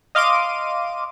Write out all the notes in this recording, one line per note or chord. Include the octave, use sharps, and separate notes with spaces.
D#5 F5 C6 D6 D#7